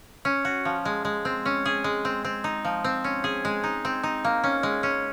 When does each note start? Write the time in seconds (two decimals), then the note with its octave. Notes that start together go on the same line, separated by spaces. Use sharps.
0.25 C#4
0.45 F#4
0.65 F3
0.85 G#3
1.05 G#3
1.25 C4
1.45 C#4
1.66 G#4
1.84 G#3
2.05 C4
2.25 C4
2.44 D#4
2.65 F3
2.84 C4
3.04 C#4
3.24 G#4
3.45 G#3
3.64 D#4
3.85 C4
4.03 D#4
4.25 A#3
4.44 C#4
4.63 G#3
4.83 C#4